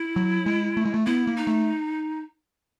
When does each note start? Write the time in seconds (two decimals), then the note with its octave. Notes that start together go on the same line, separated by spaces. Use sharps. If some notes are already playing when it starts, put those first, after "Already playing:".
Already playing: E4
0.16 F#3
0.46 G#3
0.77 A3
0.85 G#3
0.94 A3
1.06 B3 E4
1.27 A#3
1.37 D#4
1.47 A3